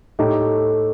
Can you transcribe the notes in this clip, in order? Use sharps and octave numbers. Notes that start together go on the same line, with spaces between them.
A2 A3 D#4 G4